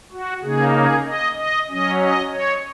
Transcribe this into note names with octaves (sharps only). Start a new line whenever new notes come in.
F#4
C#3 A#3 D#4 G#4
G#4
D#5
D#5
F#3 C#4 D#5
D#5
C#5